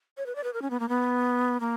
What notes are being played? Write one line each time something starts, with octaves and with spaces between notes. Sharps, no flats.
C#5
B4
D5
B4
A#4
C#4
B3
A#3
B3
A#3